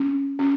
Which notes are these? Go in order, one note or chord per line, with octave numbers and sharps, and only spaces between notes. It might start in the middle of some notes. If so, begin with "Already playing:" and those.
Already playing: C#4
C#4